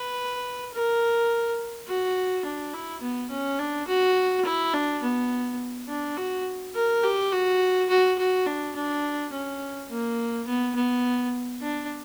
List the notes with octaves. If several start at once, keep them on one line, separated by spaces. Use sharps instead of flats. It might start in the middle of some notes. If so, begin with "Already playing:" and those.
Already playing: B4
A#4
F#4
D4
E4
B3
C#4
D4
F#4
E4
D4
B3
D4
F#4
A#4
G4
F#4
F#4
F#4
D4
D4
C#4
A#3
B3
B3
D4